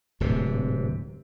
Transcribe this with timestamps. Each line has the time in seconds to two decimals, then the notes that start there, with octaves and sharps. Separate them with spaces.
0.20 D1 G#2 C3